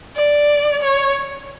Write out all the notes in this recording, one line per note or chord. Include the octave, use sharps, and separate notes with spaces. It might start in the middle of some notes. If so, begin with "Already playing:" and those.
D5
C#5